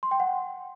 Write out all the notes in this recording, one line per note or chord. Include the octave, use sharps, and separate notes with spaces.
C6
G5
F#5